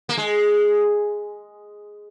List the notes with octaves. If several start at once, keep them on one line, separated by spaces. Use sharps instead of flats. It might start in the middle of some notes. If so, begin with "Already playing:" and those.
A#3
G#3